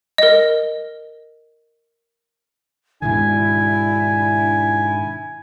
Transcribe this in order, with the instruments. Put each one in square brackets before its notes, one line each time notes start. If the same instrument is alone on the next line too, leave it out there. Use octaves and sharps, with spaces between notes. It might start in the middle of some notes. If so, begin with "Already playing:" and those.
[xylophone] A#4 D#5
[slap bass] G#2 B2 D#3 [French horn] D4 [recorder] E4 [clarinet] G#5